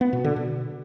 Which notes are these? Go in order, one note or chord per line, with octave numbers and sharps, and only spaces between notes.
B3
B2
D3
B2